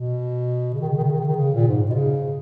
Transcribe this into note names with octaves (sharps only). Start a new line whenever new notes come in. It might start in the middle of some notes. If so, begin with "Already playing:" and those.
Already playing: B2
C#3
D#3
C#3
D#3
C#3
D#3
C#3
D#3
C#3
A#2
G#2
B2
C#3